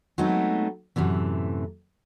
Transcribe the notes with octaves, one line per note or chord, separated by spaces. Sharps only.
F#3 G#3 A3 B3 C4 D#4
F#2 A2 C3 E3